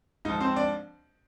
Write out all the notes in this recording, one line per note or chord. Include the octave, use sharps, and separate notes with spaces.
G#2 F3 D#4 D#5
C4 C5
D4 D5